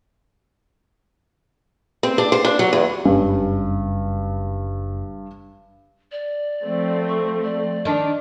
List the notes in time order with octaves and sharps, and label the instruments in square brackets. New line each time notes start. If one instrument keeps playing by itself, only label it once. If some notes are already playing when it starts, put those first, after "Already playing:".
[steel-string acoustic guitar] C4
D4
C5
D4
F#3
E2
[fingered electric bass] F#1 C#4 [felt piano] G2 G3
[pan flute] D5
[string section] F3 A3 C4
[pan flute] C#6
D5
[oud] D#3 D4